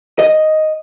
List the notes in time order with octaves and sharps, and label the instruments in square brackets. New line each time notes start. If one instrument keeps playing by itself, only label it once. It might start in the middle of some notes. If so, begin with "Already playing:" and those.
[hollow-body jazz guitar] D#5